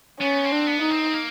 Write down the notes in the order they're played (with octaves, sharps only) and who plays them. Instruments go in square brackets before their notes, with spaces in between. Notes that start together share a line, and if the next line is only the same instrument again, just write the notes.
[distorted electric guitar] B3 [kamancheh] C#4
[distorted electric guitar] C4
[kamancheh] D4
[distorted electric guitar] B3
[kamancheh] D#4
[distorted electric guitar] C4
A#3